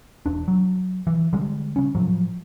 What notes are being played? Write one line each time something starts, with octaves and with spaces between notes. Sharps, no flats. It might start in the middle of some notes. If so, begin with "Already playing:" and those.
E1 D4
F#3
E3
D3 G3 G#3
C#3 C#4
A2 F3 F#3